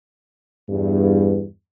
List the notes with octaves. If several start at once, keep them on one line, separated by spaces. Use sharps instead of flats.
E2 G2